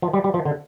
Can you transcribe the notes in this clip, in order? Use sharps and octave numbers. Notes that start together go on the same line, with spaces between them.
F3
G3
G3
F3
D3